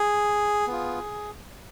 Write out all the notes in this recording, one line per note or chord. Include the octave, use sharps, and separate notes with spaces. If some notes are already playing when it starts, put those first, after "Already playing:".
Already playing: G#4
B3 F4